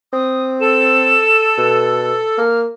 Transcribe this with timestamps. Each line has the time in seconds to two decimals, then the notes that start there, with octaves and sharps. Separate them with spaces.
0.13 C4 D#6
0.61 A4 E7
1.57 B2
2.38 A#3 F6